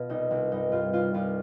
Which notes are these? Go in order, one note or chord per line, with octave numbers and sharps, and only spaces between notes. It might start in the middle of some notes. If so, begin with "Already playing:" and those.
Already playing: B2 F4
C2 D#4
C2
G2 D#4
G2 F4
C2 F4
C2 F4